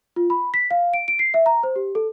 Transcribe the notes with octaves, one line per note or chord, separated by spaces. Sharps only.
F4
B5
B6
F5
D7
D7
C7
E5
A#5
C5
G4
A4